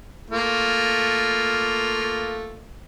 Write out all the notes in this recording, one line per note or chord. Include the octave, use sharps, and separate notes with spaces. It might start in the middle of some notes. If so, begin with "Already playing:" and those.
A3 A#3 F4